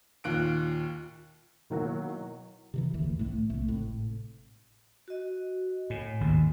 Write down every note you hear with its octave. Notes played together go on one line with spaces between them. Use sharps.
D#2 A#2 F4 F#6 D7
B2 D#3 E3 F#3 A#3 F#4
C3 D#3 E3
F#1 D2 E3
C2 A2 A3
C2 A3
G#1 A2 C3
F#4 D#5
A2 G#5
G#1 D#2 B2